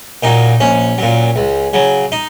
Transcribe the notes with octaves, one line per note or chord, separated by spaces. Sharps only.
A#2 F#3 D#4
A#1 C#4
A#2 F#3
C#2
C#3 F#3
D#4